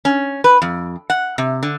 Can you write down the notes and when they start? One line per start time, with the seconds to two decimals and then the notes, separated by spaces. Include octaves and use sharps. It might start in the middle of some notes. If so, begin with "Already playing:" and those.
0.05 C#4
0.44 B4
0.62 F2
1.10 F#5
1.38 C3
1.63 D3